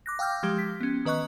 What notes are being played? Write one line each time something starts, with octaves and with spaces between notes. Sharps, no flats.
D6 F#6 A#6
F5 G5 D6 E6 F6 G6
F3 G#3 G4
B6
B3 C#4
D#3 B4 D#5 C#6 F#6